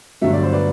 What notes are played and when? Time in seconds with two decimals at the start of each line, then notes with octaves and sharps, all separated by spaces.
0.21 G1 G2 D3 F#3 A3 E5
0.33 D5
0.43 C5
0.53 B4 D5